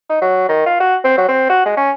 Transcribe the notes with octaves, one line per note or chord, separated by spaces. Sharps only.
D#4
F#3
D#3
F4
F#4
C4
F#3
C4
F#4
G#3
C#4